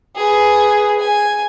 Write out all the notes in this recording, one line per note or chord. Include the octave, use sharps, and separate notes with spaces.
G#4 B4
G#5